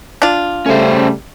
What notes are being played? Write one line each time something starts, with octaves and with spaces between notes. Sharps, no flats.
D4 F4
C#3 G3 A3 C#4 C5